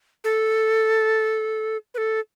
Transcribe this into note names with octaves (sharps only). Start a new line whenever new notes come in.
A4
B4
A4